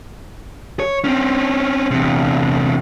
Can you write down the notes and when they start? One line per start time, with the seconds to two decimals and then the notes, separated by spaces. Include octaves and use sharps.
0.80 C#5
1.04 C4 C#4
1.91 E2 C3